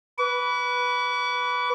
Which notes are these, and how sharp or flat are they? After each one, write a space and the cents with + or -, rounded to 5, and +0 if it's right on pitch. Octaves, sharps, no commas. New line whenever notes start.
B4 -5 D6 -45